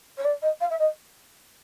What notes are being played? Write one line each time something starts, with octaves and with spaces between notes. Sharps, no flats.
C#5
D5
D#5
F5
E5
D#5